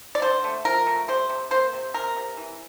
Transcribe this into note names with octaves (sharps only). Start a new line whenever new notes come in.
D5
D3 C5
A3
F3 A#4
A3
G3 C5
C3
A#3 C5
C3
C3 A#4
C3
E3